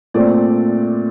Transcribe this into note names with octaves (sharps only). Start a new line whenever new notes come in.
A#2 A3 C4 D5